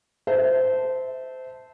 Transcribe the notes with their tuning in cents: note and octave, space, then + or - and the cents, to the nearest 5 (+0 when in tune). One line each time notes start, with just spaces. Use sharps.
C5 -20 E5 -20 A5 +0